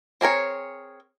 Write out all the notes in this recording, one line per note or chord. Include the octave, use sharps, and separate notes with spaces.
C4 G#4 A#4 C#5